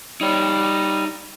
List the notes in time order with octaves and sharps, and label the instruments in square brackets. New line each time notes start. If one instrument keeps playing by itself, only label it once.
[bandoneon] G3 [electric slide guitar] D#4 C#5